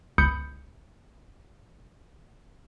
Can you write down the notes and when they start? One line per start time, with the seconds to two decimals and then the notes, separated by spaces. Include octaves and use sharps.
0.18 G1 C#2 B5 D#6 G6 C#7